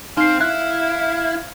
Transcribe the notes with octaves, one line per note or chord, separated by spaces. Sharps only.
C4 D#4 F5 C7
E4 F5 F#6